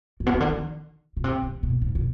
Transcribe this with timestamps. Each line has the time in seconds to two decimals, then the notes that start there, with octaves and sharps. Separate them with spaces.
0.20 G#2
0.26 B2
0.34 C3
0.40 D3
0.49 D#3
1.17 B2
1.24 C3
1.43 C3
1.63 B2
1.82 G#2
1.95 B2